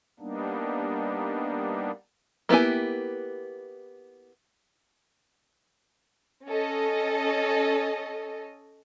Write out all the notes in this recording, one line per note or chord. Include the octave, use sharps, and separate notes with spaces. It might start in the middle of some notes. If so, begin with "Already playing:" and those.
G3 A#3 B3 D4 D#4
A#3 B3 E4 G4 G#5
C#4 A4 D#5